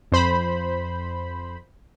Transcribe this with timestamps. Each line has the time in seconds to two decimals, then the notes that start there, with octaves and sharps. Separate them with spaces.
0.12 F2 C5 B5